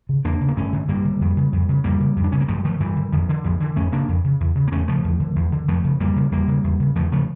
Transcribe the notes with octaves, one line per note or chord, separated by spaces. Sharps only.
C#3
E2 A#3 D4
C#3
A#3
G2 A3 C#4
D3
G2 G3 A#3
D3
F2
C#3
F2
C#3
F2 G3 A#3
C#3
F2
D4
C#3 C#4
A#3
G2 F3 A3
G3
D3 F3 A3
G2 E3 G3
D3
F2 D3 F3
D3
F2 D3 F3
D3 E3
F2 A3 C#4
C#3 A#3 D4
F2
C#3
E2
C#3
A#3
E2 A3 C#4
C#3 F3 A3
E2
D3
E2
D3
F2 F3 A3
C#3
F2 G3 A#3
C#3
E2 G3 A#3
C#3
E2
C#3
E2 F3 A3
C#3 F3 A3